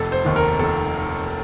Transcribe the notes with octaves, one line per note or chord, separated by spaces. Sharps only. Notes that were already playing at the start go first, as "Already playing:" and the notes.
Already playing: F1 A4
C5
D#2 D#3
A#4
F1 A4